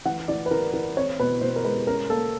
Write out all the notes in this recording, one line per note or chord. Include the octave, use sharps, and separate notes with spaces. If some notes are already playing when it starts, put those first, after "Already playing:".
E3 F#5
E3 D5
B4
E3 A#4
E3 A#4
C4 C#5
B2 B4
B2 C5
A#4
G#3 B4
C#4 A#4
A#3 A4